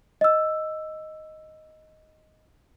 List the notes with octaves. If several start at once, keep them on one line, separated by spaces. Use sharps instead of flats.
D#5 E6